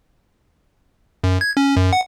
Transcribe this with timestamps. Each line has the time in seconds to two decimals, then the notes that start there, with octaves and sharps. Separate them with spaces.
1.24 F#2
1.41 G#6
1.57 C#4
1.77 F#2
1.93 F#5